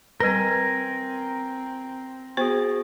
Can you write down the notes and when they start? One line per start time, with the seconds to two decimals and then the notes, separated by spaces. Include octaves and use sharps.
0.20 G3 C4 A#4 B4 G#5
2.37 B3 F#4 G#4 C5